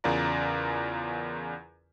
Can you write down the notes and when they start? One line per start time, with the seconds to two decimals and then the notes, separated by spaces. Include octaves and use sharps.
0.04 E2 C#3 F4 A#4 D5 A#5